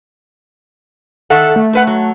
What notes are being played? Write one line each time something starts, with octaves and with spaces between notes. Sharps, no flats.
D#3 A4 E5 F#5
A3
A4 B4 F#5
F#3